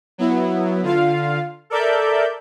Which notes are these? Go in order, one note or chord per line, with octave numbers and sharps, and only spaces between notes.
F#3 B3 E4
D3 F4 F5
A4 A#4 D5 E5 G6